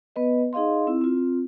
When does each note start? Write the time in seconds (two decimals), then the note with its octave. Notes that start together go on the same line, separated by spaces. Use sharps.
0.16 B3 B4 D#5
0.53 D#4 G#4 D#5 F5 C6
0.87 C4 E4
1.01 C4 F4